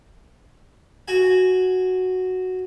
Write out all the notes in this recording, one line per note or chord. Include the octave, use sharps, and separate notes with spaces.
F#4 G#5